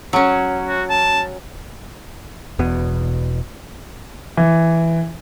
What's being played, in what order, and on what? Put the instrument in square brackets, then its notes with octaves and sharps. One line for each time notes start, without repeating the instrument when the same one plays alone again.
[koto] F#3 C#4
[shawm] F#4
A5
[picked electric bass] E1 E2 B2 B3
[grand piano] E3